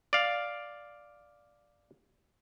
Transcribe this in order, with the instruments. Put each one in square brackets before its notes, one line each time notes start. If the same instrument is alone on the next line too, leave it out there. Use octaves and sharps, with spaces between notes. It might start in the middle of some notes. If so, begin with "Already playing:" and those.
[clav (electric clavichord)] D5 F5